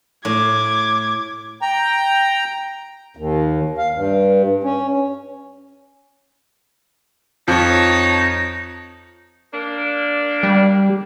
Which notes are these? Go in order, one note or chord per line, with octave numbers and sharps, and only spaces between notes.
A2 D6 G#6
G5 A#5
D#2
F5
G2
C#4
F2 D#4 C#5 A5
A#3 D4
G3